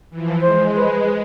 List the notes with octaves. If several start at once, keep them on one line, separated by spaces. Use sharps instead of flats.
E3 F3
G#3 C5
B4